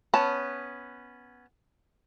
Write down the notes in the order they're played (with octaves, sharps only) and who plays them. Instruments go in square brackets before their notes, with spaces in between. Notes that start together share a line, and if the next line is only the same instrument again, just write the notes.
[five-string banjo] B3 C#4 A5